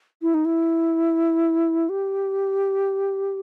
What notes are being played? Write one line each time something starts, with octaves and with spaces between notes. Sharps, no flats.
E4
D#4
E4
G4